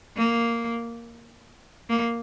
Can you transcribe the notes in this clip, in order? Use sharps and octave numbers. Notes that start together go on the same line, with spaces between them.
A#3
A#3